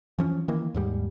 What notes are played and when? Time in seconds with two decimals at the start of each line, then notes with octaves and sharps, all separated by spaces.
0.19 E3 F3 C#4
0.48 D#3 E3 A#3
0.74 D#2 G#2 G3